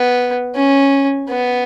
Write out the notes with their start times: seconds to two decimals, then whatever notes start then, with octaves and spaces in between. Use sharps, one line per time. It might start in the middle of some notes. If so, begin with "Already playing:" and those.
Already playing: B3
0.55 C#4
1.28 B3